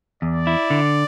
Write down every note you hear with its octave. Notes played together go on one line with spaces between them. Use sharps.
E2 D5
E4
D3